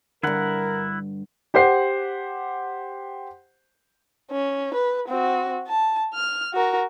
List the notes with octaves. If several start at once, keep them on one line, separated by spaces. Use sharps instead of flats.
G2 D3 E4 A#4 F#5
G4 C5 F#5 C7
C#4
B4
C4 F#4
A5
F6
F#4 A#4